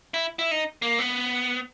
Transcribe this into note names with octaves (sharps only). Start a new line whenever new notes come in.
E4
E4
D#4
A#3
B3